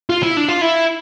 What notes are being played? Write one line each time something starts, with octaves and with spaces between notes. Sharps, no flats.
F4
E4
D4
F4
E4